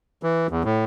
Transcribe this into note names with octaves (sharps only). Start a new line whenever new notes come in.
E3
E2
A2